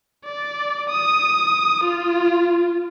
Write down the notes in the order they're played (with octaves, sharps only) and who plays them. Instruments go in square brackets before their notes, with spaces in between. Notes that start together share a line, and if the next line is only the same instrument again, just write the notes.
[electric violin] D5
D#6
F4